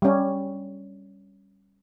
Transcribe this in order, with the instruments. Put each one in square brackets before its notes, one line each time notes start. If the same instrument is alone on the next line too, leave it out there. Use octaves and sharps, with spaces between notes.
[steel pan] G3 C#4